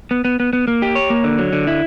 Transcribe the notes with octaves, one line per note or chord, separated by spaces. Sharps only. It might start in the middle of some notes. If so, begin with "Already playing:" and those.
B3
B3
B3
B3
A#3
G4
C#5
A#3
D3
F#3
D3
E4